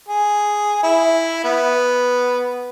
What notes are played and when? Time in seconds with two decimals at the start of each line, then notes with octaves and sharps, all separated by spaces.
0.09 G#4
0.83 E4
1.44 B3